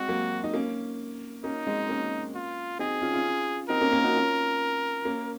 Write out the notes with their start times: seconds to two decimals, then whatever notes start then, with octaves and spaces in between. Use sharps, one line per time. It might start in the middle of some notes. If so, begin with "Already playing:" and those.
Already playing: G#3 C4 F#4
0.09 F#3 A#3
0.44 D#4
0.54 A#3 C#4
1.44 A#3 C#4 D#4
1.67 G#3 C4
1.89 A#3 C#4
2.35 F4
2.79 C4 D#4 G#4
3.02 C#4 F4
3.13 C#4 F4
3.69 C4 D#4 A#4
3.81 A#3 C#4
3.92 A#3 C#4
4.04 D#4 F#4
4.15 C#4 F4
5.05 A#3 C#4